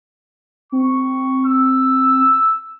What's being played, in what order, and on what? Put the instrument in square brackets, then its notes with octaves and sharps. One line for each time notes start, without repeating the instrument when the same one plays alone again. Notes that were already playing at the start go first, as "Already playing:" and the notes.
[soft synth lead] C4 [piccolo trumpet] C#6
[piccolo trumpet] E6